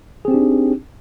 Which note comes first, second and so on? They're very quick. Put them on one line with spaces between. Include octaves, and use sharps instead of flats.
G#4 C4 G4 D4 D#4